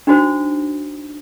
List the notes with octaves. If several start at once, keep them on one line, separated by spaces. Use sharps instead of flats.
D4 D#4 F#4 C5